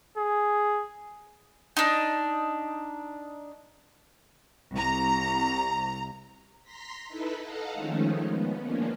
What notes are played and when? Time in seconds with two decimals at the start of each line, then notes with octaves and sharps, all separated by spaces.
0.17 G#4
1.77 D4 D#4
4.74 C2 A#5
6.63 A#5 C6 A#6 B6
7.08 D#4 E4 A4 B4
7.42 A4 D#5 F5 F#5 A5 A#5
7.74 D#3 F3 G#3 A3 C#4 D#4
8.27 B3
8.59 D#3 F3 A#3 C#4 D4